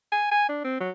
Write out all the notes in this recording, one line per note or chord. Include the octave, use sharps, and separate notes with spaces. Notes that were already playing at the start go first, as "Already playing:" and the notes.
G#5
G#5
D4
C4
F#3